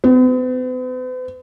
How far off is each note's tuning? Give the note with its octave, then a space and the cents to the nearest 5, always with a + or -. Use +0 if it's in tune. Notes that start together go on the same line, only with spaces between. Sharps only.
B3 +45